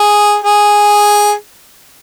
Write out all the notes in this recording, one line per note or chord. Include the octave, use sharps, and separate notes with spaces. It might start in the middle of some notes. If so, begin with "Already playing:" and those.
Already playing: G#4
G#4